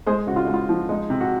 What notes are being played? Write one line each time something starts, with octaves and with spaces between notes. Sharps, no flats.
G#3 G#4 C5
C#3 F#4
F4
G#3 D#4
F4
F3
G#3 D#4
C3
F#4